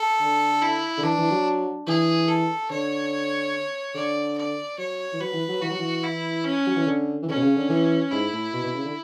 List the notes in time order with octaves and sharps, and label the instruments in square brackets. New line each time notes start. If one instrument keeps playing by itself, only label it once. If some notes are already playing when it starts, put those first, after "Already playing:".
Already playing: [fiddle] A4
[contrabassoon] D3
[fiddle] E4
[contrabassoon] D3
[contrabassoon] E3 [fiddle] D4
[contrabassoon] E3
F#3
[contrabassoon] E3 [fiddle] G#4
[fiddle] A4
[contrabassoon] D3 [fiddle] C#5
[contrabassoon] D3 [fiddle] D5
[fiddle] D5
[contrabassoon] F#3 [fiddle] C#5
[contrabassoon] E3
[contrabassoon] F#3 [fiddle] B4
[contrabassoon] E3
F#3
[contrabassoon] E3 [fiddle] F#4
[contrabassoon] F#3
E3
[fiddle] E4
C#4
[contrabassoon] F#3
E3
D3
E3
[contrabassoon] D3 [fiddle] C#4
[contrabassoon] B2
C#3
D3
E3
[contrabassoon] G#2 [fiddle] E4
[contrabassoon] A2
B2
B2
C#3
D3